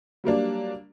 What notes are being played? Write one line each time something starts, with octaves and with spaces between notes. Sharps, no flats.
F#3 G3 A#3 D4